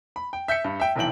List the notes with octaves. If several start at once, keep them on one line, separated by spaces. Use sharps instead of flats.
B5
G5
E5 G6 B6 C#7
G2
E5 G5
F1 B1 E3 G5 F#7